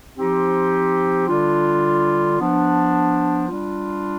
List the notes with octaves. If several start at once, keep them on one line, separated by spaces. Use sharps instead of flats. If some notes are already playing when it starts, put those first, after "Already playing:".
F3 C4 D#4 G4
D3 G3 D4 F4
F3 B3 D4
G3 D4 F4